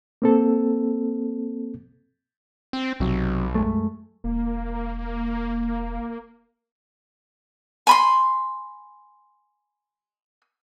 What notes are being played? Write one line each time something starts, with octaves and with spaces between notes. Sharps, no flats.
A#3 C4 A4
C4
B1 C3 F#3
F#2 G#3 A3
E1 A#3
G#5 B5 C6